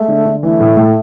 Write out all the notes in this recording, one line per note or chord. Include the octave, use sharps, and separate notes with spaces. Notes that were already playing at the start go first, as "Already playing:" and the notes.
Already playing: G#3 A3
D3
D3
E3 A3
A2
A2